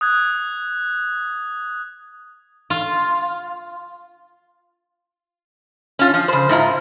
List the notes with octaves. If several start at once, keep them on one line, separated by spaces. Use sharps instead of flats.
D#6 F#6 G#6
F4
C#4 F4
F3
C#3 C5
G#2 E4 F4 A#5